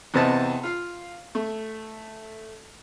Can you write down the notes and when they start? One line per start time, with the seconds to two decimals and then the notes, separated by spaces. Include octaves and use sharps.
0.14 E2 C3 C4 B4 D#5 A5
0.63 F4 F5
1.35 A3